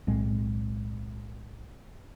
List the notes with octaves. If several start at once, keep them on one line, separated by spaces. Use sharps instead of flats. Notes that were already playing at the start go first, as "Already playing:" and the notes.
B1 A2 G#3 C4